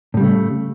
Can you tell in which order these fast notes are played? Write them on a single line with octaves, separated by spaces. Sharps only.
A2 G3 C#3 A3